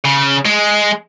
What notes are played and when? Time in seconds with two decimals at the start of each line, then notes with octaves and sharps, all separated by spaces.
0.04 C#3
0.45 G#3